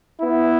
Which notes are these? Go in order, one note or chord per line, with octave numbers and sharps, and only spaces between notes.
B3 E4